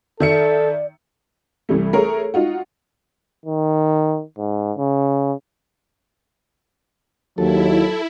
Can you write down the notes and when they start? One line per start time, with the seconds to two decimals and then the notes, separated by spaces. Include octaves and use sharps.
0.20 D#3 A4 D5 E5 C#7
1.69 C2 E3 G3 A3
1.93 A3 G#4 A#4 C#5
2.34 D#4 F4 F#4
3.46 D#3
4.38 G#2
4.77 C#3
7.38 D#2 F#3 E4 A4